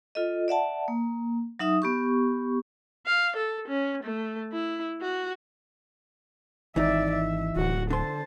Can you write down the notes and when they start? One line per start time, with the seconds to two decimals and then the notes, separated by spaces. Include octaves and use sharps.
0.15 F4 A4 D#5
0.48 D5 E5 F#5 A5
0.88 A#3
1.59 F#3 D#4 E5 D#6
1.82 B3 G4 C#6
3.06 F5
3.36 A4
3.68 C#4
4.03 A3
4.52 E4
5.01 F#4
6.76 G#1 E3 D#4 D5 E5
7.12 E5
7.56 D1 F#4 F#5
7.90 D3 C5 A5 C6